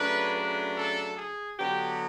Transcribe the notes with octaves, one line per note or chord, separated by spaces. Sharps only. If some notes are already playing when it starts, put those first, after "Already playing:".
Already playing: C#3 F#3 A3 D4 B4
B4
A4
G#4
D3 F#3 B3 G4